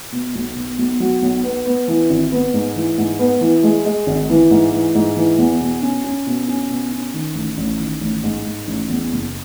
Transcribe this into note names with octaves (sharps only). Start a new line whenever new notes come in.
B2
B1
B2
B1
F#3
B1
B3
B3
E3
G#1
B3
G#2
E3
G#2
B3
E3
G#3
G#3
G#1
E3
G#2
E3
G#2
E3
E2
B2
C#4
C#4
B2
C#4
B2
C#4
D#3
A1
A1
D#3
A1
G#2
G#2
A1
E2
F#1